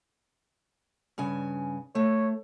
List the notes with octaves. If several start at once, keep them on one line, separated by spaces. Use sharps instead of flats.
G2 C#3 G#5
A3 C#5